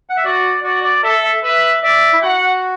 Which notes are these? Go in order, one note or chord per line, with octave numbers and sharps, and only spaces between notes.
F#5
E5
F#4 D5
F#4 D5
D5
A4 E5
E5
B4 E5
D5 E5
E4
F#4 F#5